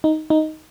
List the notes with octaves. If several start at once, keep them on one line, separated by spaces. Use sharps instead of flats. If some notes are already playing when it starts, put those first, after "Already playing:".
D#4
D#4